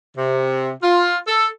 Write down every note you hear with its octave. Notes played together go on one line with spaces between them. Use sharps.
C3
F4
A4